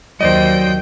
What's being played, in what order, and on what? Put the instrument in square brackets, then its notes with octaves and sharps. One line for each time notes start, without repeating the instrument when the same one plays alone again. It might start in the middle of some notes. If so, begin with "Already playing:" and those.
[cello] D#2 G5 [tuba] F#3 [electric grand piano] C5 D5 D#5